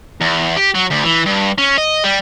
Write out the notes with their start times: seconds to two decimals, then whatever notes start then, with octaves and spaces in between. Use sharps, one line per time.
0.21 E2
0.57 G4
0.75 F#3
0.90 D2
1.04 E3
1.26 G2
1.58 C#4
1.78 D#5
2.04 G3